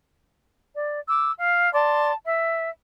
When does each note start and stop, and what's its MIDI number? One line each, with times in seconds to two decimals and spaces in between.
0.74 0.98 74
1.09 1.31 86
1.09 1.31 88
1.38 1.72 77
1.73 2.12 74
1.73 2.12 81
1.73 2.12 84
2.25 2.70 76